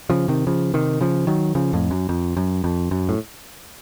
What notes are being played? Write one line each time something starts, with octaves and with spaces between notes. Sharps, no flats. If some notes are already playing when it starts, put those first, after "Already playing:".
C#3 F3
C3 D#3
C#3 F3
C3 D#3
C#3 F3
D#3 F#3
C#3 F3
F2 A2
F#2
F2
F#2
F2
F#2
A2